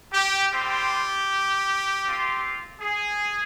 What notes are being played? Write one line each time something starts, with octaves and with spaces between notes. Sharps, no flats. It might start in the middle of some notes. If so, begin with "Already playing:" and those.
G4
G3 C4 F4 G4
C4 F4
G#4